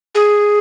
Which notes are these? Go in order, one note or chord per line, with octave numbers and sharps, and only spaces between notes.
G#4